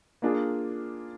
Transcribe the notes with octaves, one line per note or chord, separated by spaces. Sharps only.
A#3 D4 F4 G#4